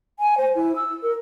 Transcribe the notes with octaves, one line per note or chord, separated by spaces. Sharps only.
G#5
C5
E4
E6
A#4